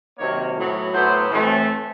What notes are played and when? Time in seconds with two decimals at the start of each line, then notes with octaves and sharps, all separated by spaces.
0.18 C3 D#3 F#3 A#3 C#5
0.55 A2 F#3 B3
0.93 A2 F#3 B3 C5
1.30 A2 E3 A3 C4